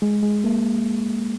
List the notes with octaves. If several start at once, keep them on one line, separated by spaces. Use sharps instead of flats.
G#3
G#3
A#3